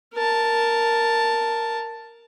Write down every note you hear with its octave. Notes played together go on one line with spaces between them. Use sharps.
A#4 A5